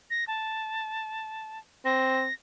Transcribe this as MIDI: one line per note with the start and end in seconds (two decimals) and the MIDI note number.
0.10 0.24 94
0.27 1.59 81
1.85 2.27 60
1.85 2.33 94